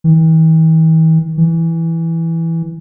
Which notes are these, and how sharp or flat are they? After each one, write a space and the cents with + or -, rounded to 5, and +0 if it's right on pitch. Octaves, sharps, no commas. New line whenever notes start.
E3 -45
E3 +0